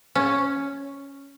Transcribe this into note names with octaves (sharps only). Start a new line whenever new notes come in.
C#4